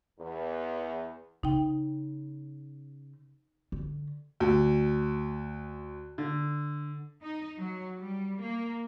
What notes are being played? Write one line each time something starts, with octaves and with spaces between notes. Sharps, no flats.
E2
C#3 D#4 G5
D3
D2
D3
D#4
F#3
G3
A#3